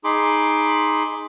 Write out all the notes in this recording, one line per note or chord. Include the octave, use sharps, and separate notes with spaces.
D#4 G#4 B5 C6 D6